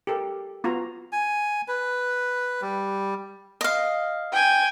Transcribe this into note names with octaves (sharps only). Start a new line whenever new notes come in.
G4 A4 A#4
B3 F4 F#4 A#5
G#5
B4
G3
D#5 F5
G5 G#5